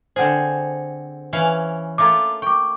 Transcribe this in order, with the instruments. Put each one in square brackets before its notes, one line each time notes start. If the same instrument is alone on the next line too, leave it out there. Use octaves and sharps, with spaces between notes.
[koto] D3 C4 G#4 [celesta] C5 F#5
[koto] E3 C#4 F5
[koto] A3 A#3 F4 [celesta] A#5 D6
[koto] G5 [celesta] C#6 D6